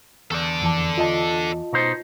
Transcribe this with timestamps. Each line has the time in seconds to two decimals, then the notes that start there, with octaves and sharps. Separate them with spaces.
0.31 E2 A4 D5
0.61 F2 E3 A5
0.98 F4 D#5 A5
1.73 B2 D#4 C5